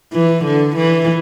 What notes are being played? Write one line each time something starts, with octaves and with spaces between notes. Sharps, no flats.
E3
D3
E3